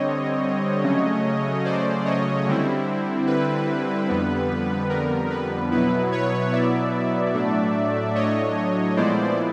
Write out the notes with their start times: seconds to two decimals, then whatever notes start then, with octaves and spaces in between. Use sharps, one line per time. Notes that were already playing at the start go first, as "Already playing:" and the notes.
Already playing: D3 G3 C4 C#5 D#5
0.84 C#3 F#3 A3 C#4
1.65 C5 D5
2.05 C#5 D#5
2.46 D3 G3 C4 E4
3.27 B4
4.09 F2 D3 G3 B3
4.89 A#4
5.30 B4
5.71 B2 F#3 B3 E4 B4
6.12 B4 C#5
6.53 D5 E5
7.34 A2 F#3 A3 D4
8.15 C#5 D#5
8.97 A#2 F3 G#3 B3 E4 C5 D5